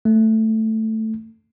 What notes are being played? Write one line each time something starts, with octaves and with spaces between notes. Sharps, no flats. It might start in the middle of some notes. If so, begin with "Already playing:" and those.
A3